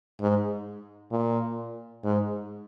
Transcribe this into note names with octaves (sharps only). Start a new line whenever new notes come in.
G#2
A#2
G#2